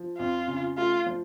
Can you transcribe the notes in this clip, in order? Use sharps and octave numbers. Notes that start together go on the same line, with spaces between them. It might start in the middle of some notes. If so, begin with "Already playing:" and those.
Already playing: F3
F2 F4
C#3
A3 F4
F3